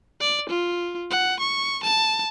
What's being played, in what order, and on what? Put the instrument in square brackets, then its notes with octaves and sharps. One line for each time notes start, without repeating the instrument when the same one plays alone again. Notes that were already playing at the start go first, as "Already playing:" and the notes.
[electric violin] D5
F4
F#5
C#6
A5